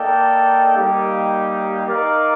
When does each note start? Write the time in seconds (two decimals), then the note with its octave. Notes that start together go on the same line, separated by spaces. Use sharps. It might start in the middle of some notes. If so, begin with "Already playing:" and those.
Already playing: A#3 D#4 A4 D5 G5
0.75 G3 A#3 D#4 G4
1.87 D#4 A#4 D5 F5